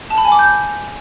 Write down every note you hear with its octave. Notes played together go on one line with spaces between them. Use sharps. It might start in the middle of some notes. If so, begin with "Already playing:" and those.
A5
B5
G#5
D6
G6